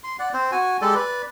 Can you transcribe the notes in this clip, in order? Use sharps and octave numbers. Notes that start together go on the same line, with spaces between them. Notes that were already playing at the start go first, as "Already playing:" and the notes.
C6
D5 F#5
C4 C5
F#4 G#5
G#3 G4 A4 D5
B4 D5